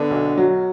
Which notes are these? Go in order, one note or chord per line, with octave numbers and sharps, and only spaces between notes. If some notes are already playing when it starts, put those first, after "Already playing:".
Already playing: D3 B3
B1
F#3